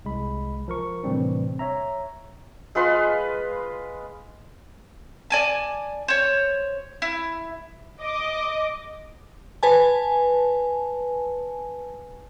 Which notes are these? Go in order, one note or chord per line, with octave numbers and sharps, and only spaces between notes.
C2 G#3 B5
F3 A#4 C#6
A2 C3 E3 G3 C4 D4
C#5 E5 A#5
G#3 F4 B4 C6
D5 G#5 A5
C5 C#5
E4
D#5 D6
B4 G#5 A5